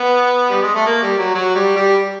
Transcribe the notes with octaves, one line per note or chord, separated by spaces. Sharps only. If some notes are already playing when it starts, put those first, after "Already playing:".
Already playing: B3
G3
G#3
A3
A#3
G3
F#3
F#3
G3
G3